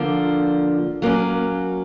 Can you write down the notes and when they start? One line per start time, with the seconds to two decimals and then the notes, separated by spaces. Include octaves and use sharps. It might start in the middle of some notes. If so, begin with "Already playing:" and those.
Already playing: D3 F3 A#3
1.02 F#3 A#3 C#4